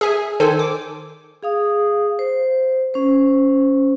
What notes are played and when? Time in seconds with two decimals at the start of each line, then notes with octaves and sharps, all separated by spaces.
0.01 G#4 E5 G#5
0.40 D#3 A4 C5 G#5
0.59 D6
1.43 G#4 F5 D#6
2.19 C5
2.94 C#4 C5